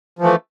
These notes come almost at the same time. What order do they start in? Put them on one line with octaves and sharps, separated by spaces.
F3 E3 A3